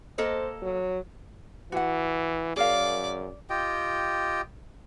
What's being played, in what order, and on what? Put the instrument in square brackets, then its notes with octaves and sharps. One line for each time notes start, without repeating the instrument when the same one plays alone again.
[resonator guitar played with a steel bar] A#3 A4 D#5 [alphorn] C5
[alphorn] F#3
[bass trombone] E3 [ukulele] F#4 F#5
[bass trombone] F#2 [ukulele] G#4 A#4 F5 [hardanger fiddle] D5
[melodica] F4 G4 D#5 G5